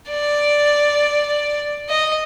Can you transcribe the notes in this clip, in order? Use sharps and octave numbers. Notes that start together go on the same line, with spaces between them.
D5
D#5